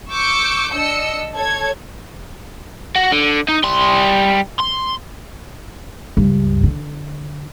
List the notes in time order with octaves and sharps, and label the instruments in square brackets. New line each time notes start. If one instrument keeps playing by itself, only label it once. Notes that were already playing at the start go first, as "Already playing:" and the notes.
[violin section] C#6 D6 E6 G6 C#7
D4 D#5 E6 C#7
A4 C#5 G#6
[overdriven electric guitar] F#4
D3
D#4
G3 C6
C6
[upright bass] C#2 G2
D3